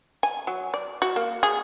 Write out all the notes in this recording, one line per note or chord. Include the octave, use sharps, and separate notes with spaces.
G#5
F#3
D5
F#4
A#3
G#4